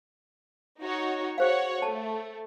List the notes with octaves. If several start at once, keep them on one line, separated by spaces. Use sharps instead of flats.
D#4 F#4 C#5
F#4 G#4 C5 C#5 F5 F#5
A3 A5